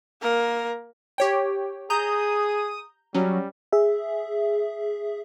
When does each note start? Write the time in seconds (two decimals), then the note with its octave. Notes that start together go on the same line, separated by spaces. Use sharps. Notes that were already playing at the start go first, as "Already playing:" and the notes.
0.22 A#3 A#4
1.18 G4 C#5 G5
1.90 G#4 A#5 D#6 G6
3.15 F#3 G3 C#4
3.72 G#4 E5